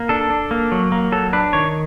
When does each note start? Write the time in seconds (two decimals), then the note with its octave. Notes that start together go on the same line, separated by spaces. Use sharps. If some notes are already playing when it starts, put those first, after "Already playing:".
Already playing: A#3
0.09 D4 A4
0.30 D4
0.51 A#3
0.72 F#3
0.92 A#3
1.12 F#3 A4
1.33 D4 B4
1.53 D#3 C#5